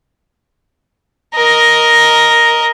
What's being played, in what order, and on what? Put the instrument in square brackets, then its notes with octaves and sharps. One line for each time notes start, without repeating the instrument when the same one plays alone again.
[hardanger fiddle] A#4 D#5